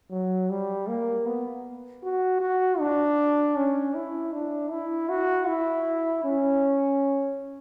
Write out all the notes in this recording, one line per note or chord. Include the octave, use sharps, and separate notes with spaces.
F#3
G3
A#3
B3
F#4
F#4
D4
C#4
E4
D4
E4
F#4
E4
C#4